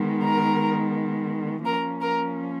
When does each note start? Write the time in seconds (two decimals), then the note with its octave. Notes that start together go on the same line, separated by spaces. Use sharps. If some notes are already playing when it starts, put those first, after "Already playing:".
Already playing: D#3 G#3 B3
0.25 A#4 A#5
1.65 F3 A#3 C#4 A#4 A#5
2.01 A#4 A#5